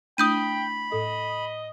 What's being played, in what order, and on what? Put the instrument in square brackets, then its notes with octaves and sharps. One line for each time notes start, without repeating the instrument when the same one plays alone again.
[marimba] A3 D4 E4 [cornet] G5 [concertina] B5 [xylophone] D#6 G6 D#7
[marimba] A2 A4 [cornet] D#5